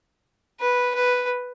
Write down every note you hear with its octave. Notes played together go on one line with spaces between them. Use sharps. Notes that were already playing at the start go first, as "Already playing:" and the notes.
B4
B4